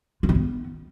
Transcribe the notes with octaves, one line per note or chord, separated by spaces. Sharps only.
F4
E4
B3